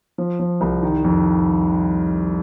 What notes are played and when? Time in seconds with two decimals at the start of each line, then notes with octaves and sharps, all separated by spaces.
0.18 F3
0.39 F3
0.61 C2
0.83 D#3
1.04 F2